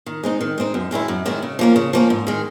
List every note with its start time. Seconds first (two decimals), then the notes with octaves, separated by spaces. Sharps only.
0.06 D#3
0.23 G#3 C4 D#4
0.41 D#3
0.58 G#3 C4 D#4
0.74 F#2
0.91 D#3 G#3 C#4 E4
1.08 F#2
1.26 D#3 G#3 C#4 E4
1.43 C#3
1.59 F3 A#3 C#4
1.76 C#3
1.93 F3 A#3 C#4
2.10 G#2
2.27 D#3 G#3